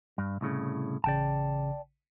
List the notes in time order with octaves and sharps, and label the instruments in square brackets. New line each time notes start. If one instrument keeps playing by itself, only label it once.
[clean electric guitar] G2
C2 A2 C#3
[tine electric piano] A1 C#3 [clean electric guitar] D5 G5 A5